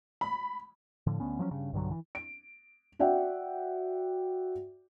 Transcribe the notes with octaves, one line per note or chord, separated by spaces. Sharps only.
B5
A2 D3 F3
D2 B3 C#4
F3 F#3 C4 C#4
G2 C#3
B1 G2 D3 F#3
E3
D7
F#4 D5 E5 F#5 G5